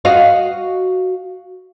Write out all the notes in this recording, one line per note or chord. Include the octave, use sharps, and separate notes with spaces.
F#4 D#5 F5